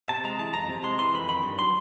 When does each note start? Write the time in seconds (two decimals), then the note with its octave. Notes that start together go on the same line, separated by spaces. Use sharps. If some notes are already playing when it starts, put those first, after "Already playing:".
0.09 C3 A5
0.24 G#3 A#5
0.39 E3 A5
0.54 F2 A#5
0.70 C3
0.84 G#3 C6
0.99 E3 C6
1.14 F2 B5
1.29 D#3 B5
1.43 G2
1.59 F#3 C6